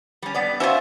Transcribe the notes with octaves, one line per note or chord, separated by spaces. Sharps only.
G3 C#4
G2 B3 D5
C#4 F4 F#4 C5 E5